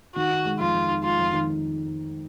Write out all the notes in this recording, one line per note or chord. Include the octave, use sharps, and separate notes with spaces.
D#3 F#4
D#4
G#3
F2 F4
D#3
D#4
G#3 F4
F2
D#3
D#4